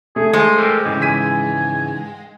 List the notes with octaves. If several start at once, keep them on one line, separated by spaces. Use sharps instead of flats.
A3 G#4
G#3 C5
G4 A4 A#4 C5
G#2 C#3 E3
G#5 B6 D#7